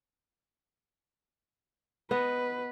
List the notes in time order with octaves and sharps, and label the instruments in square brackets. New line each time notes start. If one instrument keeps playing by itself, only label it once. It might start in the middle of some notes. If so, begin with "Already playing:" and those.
[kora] B3 D#5 F#5 [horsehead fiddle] B4